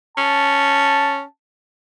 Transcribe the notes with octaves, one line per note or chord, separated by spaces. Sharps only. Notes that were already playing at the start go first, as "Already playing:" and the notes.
C#4 A5